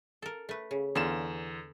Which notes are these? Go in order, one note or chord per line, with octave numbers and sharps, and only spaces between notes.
A4 A#4
A3 B4
C#3
E2 D3 F4 E7